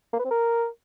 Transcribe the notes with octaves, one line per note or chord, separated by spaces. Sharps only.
A#3
B4
C4
A#4